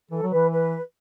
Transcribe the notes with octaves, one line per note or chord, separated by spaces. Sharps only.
E3 A4
F#3
E3 B4
B4